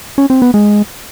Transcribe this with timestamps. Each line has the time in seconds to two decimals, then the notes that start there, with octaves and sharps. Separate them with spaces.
0.18 C#4
0.30 C4
0.42 B3
0.54 G#3